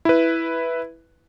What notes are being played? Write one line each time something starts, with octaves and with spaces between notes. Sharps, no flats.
E4 B4